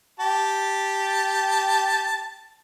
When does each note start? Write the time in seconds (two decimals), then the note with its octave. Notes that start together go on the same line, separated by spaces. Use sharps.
0.20 G4 A5